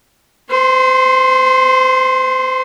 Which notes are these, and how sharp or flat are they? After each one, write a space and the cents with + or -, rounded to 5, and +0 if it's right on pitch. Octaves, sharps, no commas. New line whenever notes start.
C5 -30 C6 +15